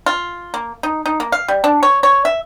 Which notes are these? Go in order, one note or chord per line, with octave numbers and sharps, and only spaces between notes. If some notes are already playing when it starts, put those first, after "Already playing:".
F4
A#3
D#4
D#4
A#3
F5
G3
D4
C#5
C#5
E5